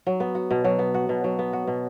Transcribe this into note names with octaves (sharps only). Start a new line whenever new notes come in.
F#3
B3
F#4
B2
F#3
B3
F#4
B2
F#3
B3
F#4
B2